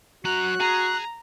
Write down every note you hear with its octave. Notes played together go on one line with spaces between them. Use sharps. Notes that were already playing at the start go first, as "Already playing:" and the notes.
F#2 F#4 A#5 F#6
G#4 A#5